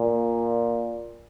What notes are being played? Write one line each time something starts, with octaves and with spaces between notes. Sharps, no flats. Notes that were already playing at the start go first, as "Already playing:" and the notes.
Already playing: A#2